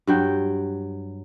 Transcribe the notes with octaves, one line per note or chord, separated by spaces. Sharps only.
G2 F#3 G5